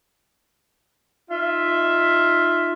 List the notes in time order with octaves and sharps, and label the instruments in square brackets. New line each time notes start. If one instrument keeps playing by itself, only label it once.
[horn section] D#4 F4 E5